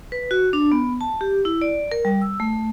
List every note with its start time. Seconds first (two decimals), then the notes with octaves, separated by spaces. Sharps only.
0.12 B4
0.31 F#4
0.53 D4
0.72 B3
1.01 A5
1.21 G4
1.45 E4
1.61 D5
1.92 A#4
2.05 G3
2.22 E6
2.40 A3